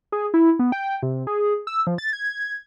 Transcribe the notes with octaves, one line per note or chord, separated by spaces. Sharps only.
G#4
E4
B3
G5
C3
G#4
E6
F3
A6
G#6